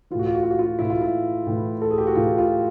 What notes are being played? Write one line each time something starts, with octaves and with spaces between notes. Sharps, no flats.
A2 E3 F4 F#4
F4
F#4
F4
F#4
F4
A2 E3 E4
F4
E4
A2 E3
A4
G#4
G4
F#4
A2 E3 F4
F4